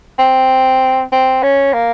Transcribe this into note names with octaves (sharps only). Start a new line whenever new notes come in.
C4
C4
C#4
A#3